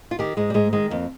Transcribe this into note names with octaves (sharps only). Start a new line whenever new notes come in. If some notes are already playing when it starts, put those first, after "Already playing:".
F4
D#3 G4
G#2 G#3
G3
G#2 G#3
D#3 G#3
F2 A#3